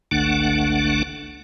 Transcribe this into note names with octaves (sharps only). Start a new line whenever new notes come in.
G1 C#2 D3 A3 D4 F#5